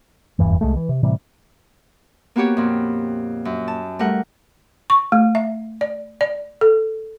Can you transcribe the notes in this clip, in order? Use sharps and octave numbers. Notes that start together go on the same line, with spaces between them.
F1 E2 G2 E3
C2 F2 G#3 A3
E3
C3
A2 C3 E3 G3
A#3 B3 F#4 G4 C#5
F2 A#2
F#2
A5
G3 A3 A#4 F#5
C#6
A3
E5
D5
D5
A4